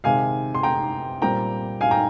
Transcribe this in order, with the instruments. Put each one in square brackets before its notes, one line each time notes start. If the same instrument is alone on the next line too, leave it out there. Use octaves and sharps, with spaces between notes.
[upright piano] C3 D#3 G#3 F5 G#5
C6
G5 A#5
A#2 G3 C4 G5 A#5
F5 G#5
G5 A#5